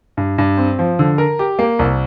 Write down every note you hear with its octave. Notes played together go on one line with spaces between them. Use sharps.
G2
G2
C4
F3
D3
A#4
G4
A#3
C2